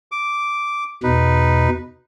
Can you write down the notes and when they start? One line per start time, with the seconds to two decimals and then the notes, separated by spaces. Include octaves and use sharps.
0.12 D6
1.03 E2 B2 D#4 B4